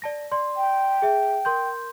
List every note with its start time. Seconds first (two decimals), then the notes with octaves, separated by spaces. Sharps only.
0.02 D5 A5 A#6
0.32 D5 C6
0.56 G5
1.02 G#4 E5
1.45 A#4 C6 G6